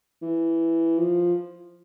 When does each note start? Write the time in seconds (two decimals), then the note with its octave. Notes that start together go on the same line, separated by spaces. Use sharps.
0.22 E3
0.98 F3